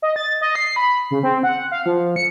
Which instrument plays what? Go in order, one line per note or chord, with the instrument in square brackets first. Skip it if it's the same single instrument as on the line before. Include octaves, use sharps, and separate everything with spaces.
[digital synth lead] D#5
A6
D#5
C7
B5
C#3
C4
F#5
F5
F3
C#7